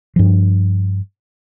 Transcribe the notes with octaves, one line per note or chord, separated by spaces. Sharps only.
G2 F3